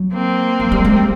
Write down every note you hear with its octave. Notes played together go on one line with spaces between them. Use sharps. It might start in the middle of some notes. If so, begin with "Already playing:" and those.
Already playing: F#3
A#3 C4
F#3
G3
G#3
G3